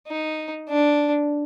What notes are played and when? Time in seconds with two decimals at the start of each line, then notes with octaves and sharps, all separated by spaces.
0.08 D#4
0.69 D4